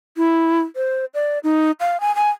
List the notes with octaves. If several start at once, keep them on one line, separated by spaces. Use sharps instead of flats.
E4
C5
D5
D#4
F5
G#5
G#5